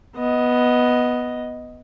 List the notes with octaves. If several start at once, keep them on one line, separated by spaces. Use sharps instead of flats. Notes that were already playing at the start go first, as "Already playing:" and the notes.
B3 D#5